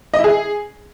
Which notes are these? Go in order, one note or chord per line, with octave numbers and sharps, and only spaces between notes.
D#5
E4
G#4